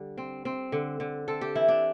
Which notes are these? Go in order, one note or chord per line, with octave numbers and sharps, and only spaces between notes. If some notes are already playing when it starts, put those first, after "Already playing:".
Already playing: D3 G3
C4
C4
D3
D3
C4 A4
G4
E3 E4
D4